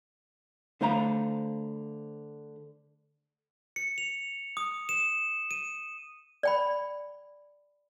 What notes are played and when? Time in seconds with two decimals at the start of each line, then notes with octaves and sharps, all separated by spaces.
0.81 D3 A3 C5 F5 A#5 B5
3.76 C#7
3.98 F7
4.57 D#6
4.89 E7
5.51 D#7
6.43 D5 G5 B5